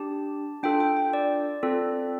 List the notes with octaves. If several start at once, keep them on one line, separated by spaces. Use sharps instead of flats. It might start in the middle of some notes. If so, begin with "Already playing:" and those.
Already playing: D4 G4 A5
D4 F4 A4 G5
G5
G5
D5
C4 F4 A4